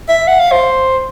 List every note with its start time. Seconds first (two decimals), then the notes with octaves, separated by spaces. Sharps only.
0.09 E5
0.28 F#5
0.40 F5
0.52 C5